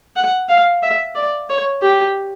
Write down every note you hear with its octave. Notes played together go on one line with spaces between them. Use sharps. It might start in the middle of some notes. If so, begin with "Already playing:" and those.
F#5
F5
E5
D5
C#5
G4